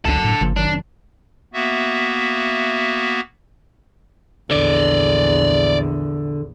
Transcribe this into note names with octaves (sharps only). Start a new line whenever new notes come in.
F#1 C#2 F#2 D3 D4 A4
A2
G1 C#3 F3 A#3
F1 D#3 F#3 D4
A#3 B3 F#4 E5
A#1 E2 D3 C#5 D5